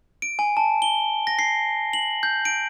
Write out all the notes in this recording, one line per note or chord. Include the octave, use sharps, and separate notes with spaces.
D7
G#5
A5
G7
A#6
C7
F#7
G6
D7